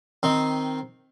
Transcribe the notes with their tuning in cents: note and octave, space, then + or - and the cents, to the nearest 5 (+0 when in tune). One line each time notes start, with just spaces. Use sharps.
D#3 +0 C4 +0